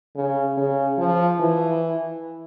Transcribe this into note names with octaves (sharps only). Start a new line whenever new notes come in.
C#3
C#3
F3
E3